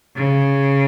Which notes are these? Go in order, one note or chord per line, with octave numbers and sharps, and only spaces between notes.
C#3